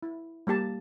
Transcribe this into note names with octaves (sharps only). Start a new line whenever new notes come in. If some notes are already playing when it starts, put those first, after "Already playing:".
E4
G3 A#3 G4 A5